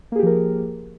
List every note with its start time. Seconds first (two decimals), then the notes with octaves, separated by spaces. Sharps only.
0.12 A#3
0.16 G#4
0.19 G4
0.23 F3
0.26 A#4